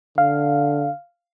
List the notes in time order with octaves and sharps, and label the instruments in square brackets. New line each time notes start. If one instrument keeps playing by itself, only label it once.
[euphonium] D3 [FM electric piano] F5